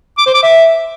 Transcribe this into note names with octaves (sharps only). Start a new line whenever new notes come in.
D6
C5
D6
E5